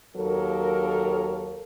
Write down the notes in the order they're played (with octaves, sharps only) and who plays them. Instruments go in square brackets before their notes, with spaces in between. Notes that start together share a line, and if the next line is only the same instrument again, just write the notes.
[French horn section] D#2 F#3 A4 A#4